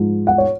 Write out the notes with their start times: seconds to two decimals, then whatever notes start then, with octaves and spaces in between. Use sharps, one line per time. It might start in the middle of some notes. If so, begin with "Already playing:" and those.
Already playing: G#2 F3
0.27 F#5
0.38 C#5